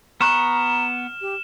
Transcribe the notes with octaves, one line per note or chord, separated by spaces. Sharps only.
B3 A#5 C#6 F6 F#6 E7
G4